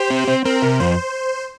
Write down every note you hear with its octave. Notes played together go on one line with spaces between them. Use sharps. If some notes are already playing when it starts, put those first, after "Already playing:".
Already playing: G4 C5
C4
C4
C4 A#4
C3
F2 C5